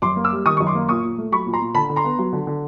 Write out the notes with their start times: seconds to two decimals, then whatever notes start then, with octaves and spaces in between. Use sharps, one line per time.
0.02 F#2 C6 D6
0.16 A#3
0.24 D6 E6
0.32 G3
0.46 D#3 C#6 D#6
0.57 F#2 C#6
0.67 C6 D6
0.75 A#3
0.89 A#2 C#6 D#6
1.03 A#2
1.18 A3
1.32 F#3 B5 C#6
1.46 A#2
1.54 A#5 C6
1.61 A#2
1.75 D3 A5 B5
1.90 D3
1.96 A#5 C6
2.04 B3
2.19 F#3
2.33 D3
2.47 D3